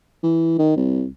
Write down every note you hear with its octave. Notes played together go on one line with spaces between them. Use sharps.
E3
D#3
C2